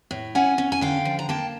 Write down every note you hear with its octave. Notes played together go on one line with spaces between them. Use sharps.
A2
C#4 F#5 G#5
C#4
G#5
D3 F5 G5
F3
A#5
A#3 G5 A5